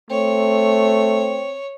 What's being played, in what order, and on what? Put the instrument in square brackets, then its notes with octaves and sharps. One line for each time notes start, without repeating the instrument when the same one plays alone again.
[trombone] A3 [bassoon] C4 [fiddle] C#5